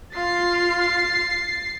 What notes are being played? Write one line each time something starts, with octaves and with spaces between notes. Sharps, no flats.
F4 F5 A6 C7